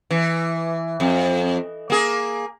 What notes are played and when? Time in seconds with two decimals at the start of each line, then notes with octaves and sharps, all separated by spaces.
0.11 E3
1.00 F2
1.90 A#3 G#4